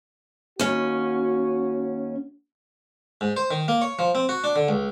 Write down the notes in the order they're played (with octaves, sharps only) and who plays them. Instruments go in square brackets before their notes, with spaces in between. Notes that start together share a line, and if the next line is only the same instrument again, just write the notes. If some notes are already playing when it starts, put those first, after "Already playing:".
[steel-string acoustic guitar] D#2 C#4 [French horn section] F#4
[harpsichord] G#2
C5
D#3
A#3
C#5
F3
C4
F#4
D4
D3
C#2